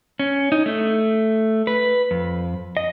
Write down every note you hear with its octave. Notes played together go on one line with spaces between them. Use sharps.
C#4
D#4
A3
B4
F2
D#5